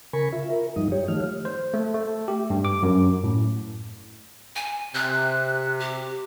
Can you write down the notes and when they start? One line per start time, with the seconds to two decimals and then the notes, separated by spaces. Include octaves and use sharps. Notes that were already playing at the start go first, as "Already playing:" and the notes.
0.13 C#3 A#4 G#5 B5 C#6
0.32 F4 E5
0.50 A#4
0.76 G2 F3 G3 D#4 D#6
0.92 G4 C#5
1.08 D#3 F3 A3 F6
1.45 C5
1.74 A3
1.94 A3
2.28 G4
2.50 G2
2.65 D6
2.83 F#2
3.24 A2
4.56 G#5
4.95 C3 F#6
5.80 G4